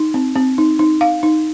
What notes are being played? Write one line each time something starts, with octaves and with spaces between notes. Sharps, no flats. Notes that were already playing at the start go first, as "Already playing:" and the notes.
Already playing: D#4
C4
C4
D#4
D#4
F5
D#4